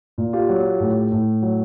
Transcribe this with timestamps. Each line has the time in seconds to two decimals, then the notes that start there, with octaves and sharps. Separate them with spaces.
0.18 A#2
0.33 F4 G4
0.49 F#3
0.80 A2
1.12 A2
1.42 F#3